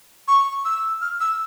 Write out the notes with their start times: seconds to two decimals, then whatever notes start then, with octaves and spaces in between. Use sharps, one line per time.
0.28 C#6
0.65 E6
1.02 F6
1.21 E6